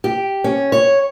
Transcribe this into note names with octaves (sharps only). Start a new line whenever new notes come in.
G4
C#4
C#5